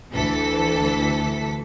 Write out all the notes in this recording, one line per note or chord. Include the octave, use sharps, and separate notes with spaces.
D2 E3 A4 B6